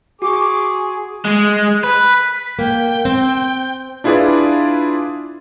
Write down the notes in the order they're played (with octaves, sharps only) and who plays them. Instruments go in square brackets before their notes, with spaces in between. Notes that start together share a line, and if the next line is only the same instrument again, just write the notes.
[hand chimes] F#4 C#6 [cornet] G#4 [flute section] D6
[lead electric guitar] G#3
B4
[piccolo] B6
[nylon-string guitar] A#3 [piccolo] G5
[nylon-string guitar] C4
[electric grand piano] D4 E4 F4 G#4 B4 D5